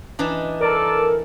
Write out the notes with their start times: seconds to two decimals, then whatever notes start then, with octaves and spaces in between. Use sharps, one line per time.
0.19 E3 D4 D#4
0.60 A4 A#4 D5 A5